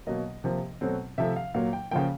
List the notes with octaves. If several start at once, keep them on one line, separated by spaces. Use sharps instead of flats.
B2 F#3 A#3 D#5
C3 F3 A#3
B2 F#3 A3 C4
C3 F3 A3 E5
F5
A#2 F#3 A#3 F5
G5
C#3 F3 A#3 G5